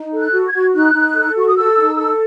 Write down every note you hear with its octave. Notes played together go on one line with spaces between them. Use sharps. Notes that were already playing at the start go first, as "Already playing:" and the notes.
Already playing: D#4
A4
F#6
F#4
G#6
F#4
D#4 F#6
D#4
A4
F#4 C#6
D#6
A4 E6
D#4
A4